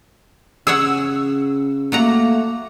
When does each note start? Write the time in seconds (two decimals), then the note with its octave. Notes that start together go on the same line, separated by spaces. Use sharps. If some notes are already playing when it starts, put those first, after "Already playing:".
0.67 C#3 G#4 C#5 F#5 E6
1.92 F#3 A3 A#3 F#5 A#5